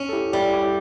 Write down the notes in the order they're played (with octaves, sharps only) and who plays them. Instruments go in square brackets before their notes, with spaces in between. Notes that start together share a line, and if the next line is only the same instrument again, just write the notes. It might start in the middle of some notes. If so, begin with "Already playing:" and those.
Already playing: [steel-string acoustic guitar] C#4
[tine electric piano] A4
E4 G4
[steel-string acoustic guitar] G3 [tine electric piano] E4 G4
[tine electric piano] E4 G4